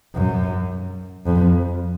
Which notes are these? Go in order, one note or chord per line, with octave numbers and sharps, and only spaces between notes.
F#2
F2